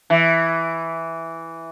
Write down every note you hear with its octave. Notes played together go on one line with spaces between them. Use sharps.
E3